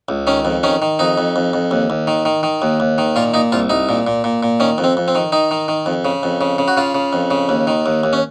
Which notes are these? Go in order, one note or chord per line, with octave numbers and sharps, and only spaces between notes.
C#2
D#3 C#4
F2
D#3 C#4
D#3
F2 D#4
F2
F2
F2
D#2
D#2
D#3
D#3
D#3
D#2
D#2
D#3
A#2 F4
A#2 D#4
C2 F4
C2 D#4
A#2
A#2
A#2
A#2
D#3 C#4
F2
C4
F2
C4
D#3
D#3 D#4
D#3
D#3
F2
C#3
F2
C#3
C#3
F#4
C#3 F4
C#3
F2
C#3
D#2
D#3
D#2
D#2
C#4